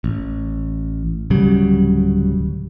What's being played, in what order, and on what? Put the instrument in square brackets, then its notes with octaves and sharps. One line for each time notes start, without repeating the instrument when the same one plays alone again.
[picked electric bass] A1
D1 C#3 F#3 G3